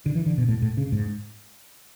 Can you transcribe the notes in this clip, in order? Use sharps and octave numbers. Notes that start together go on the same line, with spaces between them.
D3
E3
D3
B2
A2
A2
C#3
G#2